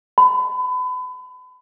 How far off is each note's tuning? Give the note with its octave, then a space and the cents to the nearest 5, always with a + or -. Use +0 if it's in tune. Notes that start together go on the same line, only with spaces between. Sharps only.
B5 +35